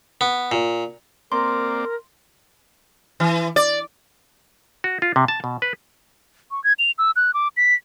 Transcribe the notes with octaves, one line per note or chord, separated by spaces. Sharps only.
B3
A#2
A#3 C4 A#4 D5 C6
E3
D5
F#4
F4
C3
A5
B2
B4
C#6
G#6
F7
E6
F#6
D6
B6